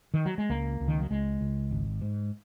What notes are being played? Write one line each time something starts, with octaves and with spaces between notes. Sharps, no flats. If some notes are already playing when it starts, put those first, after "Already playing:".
D#3
F#3
G#3
C#2 A#3
C#2
D#3
F#3
C#2 G#3
C#2
G#1
G#2